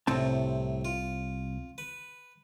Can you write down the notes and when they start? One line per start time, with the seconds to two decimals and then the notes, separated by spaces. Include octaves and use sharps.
0.07 C2 A2 C3 C4 A5
0.85 F4
1.78 B4